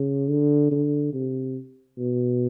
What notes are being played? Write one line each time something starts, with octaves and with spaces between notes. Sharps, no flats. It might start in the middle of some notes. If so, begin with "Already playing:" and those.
Already playing: C#3
D3
D3
C3
B2